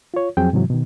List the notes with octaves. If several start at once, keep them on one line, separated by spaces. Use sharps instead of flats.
F4 C#5
F2 F3 F#3 C4 G#4 G5
G#2 C3 E3 F#3
B2 D#3